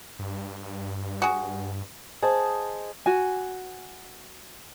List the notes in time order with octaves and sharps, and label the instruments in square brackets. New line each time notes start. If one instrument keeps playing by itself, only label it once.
[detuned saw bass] G2
[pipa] F#4 G#4
[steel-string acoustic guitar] G#4 C5 D#5 A5
[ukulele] F#4 G#5